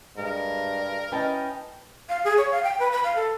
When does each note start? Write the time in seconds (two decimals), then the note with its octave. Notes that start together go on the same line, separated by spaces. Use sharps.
0.18 G2 G#3 A#4
1.12 C#4 E4 B4 D#5 G5 A5
2.09 F5
2.25 G#4
2.38 C#5
2.51 F5
2.63 G5
2.79 B4
2.92 B5
3.04 F5
3.16 A4